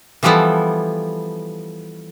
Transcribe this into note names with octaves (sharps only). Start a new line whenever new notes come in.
E3 F3 G3 B3 E4 A4